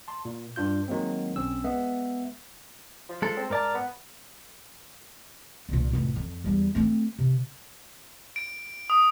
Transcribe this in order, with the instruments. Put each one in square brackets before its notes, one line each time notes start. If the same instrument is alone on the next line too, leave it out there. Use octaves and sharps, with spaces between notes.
[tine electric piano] A5 C6
A#2
G2 D4 F4 G6
D#3 F#3 G#3 A#3 C4
B1 C4 C#4 E6
G#3 B3 E5
[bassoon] F3
[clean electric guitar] G#3 A4
[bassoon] C4
[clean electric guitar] G#2 D5 A5 [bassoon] A#4
[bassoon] B3
[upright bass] C2 A#2
F1 A2
F2
E2 G3
A3 C4
C3
[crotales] D7
D#6